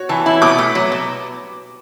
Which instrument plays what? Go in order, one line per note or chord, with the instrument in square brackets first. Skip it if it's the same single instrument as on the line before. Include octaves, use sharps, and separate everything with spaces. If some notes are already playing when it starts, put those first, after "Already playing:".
Already playing: [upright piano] F#4 C#5
[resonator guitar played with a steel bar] E3 [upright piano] A5
[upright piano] A5
[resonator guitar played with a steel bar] E4 [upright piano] B5
[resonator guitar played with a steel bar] B2 [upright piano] D6
[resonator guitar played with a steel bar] A3
F#3
B2